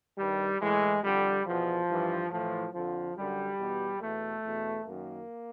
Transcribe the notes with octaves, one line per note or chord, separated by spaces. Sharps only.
G2 D#3 G3
A2 E3 G#3
F2 D3 G3
E2 B2 F3
G2 E3
A2 E3 F3
F2 D3 F3
F#2 D3 G3
E2 B2
E2 B2 A3
E2 B2
F#2 D#3 A#3